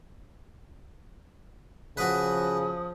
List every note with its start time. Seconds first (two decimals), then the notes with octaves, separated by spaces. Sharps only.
1.97 C#3 F3 F#4 B4 D#6